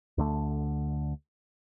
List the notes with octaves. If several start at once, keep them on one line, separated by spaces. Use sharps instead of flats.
D2 D3 A3